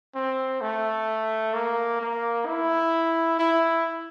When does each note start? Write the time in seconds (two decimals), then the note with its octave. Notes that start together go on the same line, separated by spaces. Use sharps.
0.15 C4
0.61 A3
1.54 A#3
2.01 A#3
2.46 E4
3.39 E4